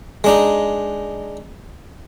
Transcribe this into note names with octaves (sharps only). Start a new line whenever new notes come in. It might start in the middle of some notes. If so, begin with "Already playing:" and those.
G#3 D4 D#4